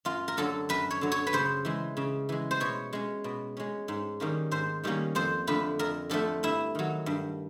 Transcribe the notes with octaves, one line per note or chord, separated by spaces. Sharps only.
F#2 F4
A#4
D3 F#3 A4
F#2 B4
C#5
D3 F#3
C#5
B4
C#3 C5
E3 G#3
C#3
E3 G#3
C5
B2 C#5
G#3 C#4
B2
G#3 C#4
G#2
D#3 G3 A#3 C#4
G#2 C5
D#3 G3 A#3 C#4
F2 C5
D3 F3 A3 B4
F2 A#4
D3 F3 A3 A4
G2 E4
D#3 F#3
G2